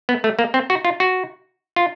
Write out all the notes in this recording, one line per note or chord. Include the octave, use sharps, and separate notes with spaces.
B3
A3
A#3
C4
F#4
F4
F#4
F4